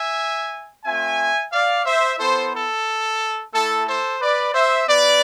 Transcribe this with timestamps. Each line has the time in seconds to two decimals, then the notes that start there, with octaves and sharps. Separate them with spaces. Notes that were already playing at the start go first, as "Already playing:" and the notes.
Already playing: E5 G#5
0.85 A3 C4 F4 E5 G#5
1.52 D5 F5
1.86 C5 E5
2.19 B3 E4 A4 C5
2.53 A4
3.54 A3 E4 A4
3.87 A4 C5
4.21 B4 D5
4.54 C5 E5
4.87 B3 E4 B4 D5